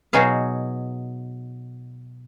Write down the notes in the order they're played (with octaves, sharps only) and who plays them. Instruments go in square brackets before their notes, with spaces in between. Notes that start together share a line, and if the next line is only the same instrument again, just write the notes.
[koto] B2 F#3 D#4 G#4 F5